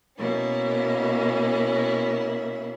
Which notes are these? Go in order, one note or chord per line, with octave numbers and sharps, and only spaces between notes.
B2 A#3 C#4 E4